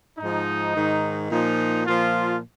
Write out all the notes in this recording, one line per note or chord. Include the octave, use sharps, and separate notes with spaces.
G#2 F3 D#4
G#2 D#3
A#2 F3 D#4
A#2 F3 F4